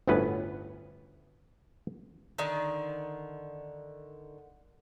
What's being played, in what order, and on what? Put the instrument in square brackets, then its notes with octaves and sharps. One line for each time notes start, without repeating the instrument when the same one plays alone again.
[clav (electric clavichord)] G1 D2 A2 B3 C#4 B4
[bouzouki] D3 D#3